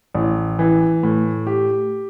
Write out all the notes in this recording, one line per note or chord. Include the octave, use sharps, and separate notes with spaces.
A1
E3
A2
G4